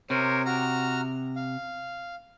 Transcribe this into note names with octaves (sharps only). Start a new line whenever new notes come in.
C3 A#4 C5 C#5
F#4 A#5 F6
F5